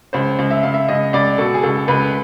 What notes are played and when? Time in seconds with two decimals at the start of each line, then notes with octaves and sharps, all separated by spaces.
0.13 C#2 C5
0.39 C#2
0.51 E5
0.63 C#2 F5
0.74 E5
0.88 C#2 D#5
1.13 C#2 D5
1.38 B2 A4
1.54 G#4
1.63 C#2 A4
1.88 C#2 B4